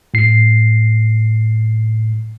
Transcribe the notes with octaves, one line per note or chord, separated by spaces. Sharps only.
A2 C7